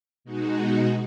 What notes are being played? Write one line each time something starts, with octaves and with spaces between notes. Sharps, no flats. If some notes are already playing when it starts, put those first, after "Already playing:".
B2 G#3 D#4 F#4